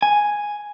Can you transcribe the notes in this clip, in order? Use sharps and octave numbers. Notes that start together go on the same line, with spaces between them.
G#5